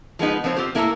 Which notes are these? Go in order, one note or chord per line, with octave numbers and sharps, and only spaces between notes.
F3 G#3 B3 D#4
F3 B3 C4 C5 C#5
C4 F4 G4 C5
A2 A#3 E4 A4 A#5